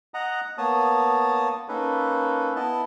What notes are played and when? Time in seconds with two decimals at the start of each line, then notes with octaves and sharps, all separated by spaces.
0.14 D#5 F#5 A#5
0.58 A#3 B3 C#5 A5 D#6
1.68 A#3 C#4 D#4 A4 B4
2.56 B3 E4 D#5 A5